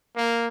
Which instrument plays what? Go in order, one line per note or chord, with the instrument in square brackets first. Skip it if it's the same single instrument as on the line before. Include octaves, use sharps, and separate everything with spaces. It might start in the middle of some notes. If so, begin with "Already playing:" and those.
[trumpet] A#3